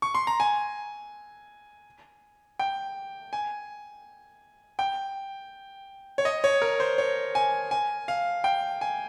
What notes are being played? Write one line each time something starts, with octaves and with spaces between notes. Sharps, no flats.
C#6
C6
A#5
G#5
G5
G#5
G5
C#5
D#5
C#5
A#4
C5
C#5
G#5
G#5
F5
G5
G#5